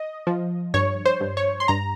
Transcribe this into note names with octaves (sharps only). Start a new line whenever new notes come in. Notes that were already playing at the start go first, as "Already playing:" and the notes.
Already playing: D#5
F3
G2 C#5
C5
G2
C#5
C6
G2 A#5